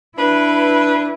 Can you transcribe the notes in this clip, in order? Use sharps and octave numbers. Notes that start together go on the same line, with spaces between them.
D4 E4 B4